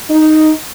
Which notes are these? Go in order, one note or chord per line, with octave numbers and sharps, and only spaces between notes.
D#4